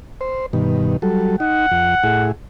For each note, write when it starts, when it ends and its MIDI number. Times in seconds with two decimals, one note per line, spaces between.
0.21 0.46 72
0.53 0.97 43
0.53 0.97 47
0.53 0.97 51
1.02 1.36 54
1.02 1.36 55
1.02 1.36 69
1.40 1.66 63
1.40 2.29 78
1.71 1.95 41
2.03 2.32 45
2.03 2.32 64
2.03 2.32 68